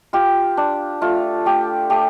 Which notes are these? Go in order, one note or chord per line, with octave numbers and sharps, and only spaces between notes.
F4 G4
D4
A3 F4
A3 G4
A3 G4